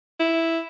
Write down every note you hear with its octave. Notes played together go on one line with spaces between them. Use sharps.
E4